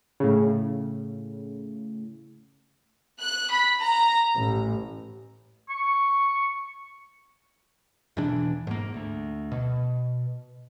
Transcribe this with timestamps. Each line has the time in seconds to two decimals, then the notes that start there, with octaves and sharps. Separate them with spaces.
0.20 A2 C#3
3.18 F#6
3.50 B5
3.79 A#5
4.35 A1
5.70 C#6
8.17 E2 B2 E3 D4
8.67 G#2 A#3
8.94 D2
9.52 B2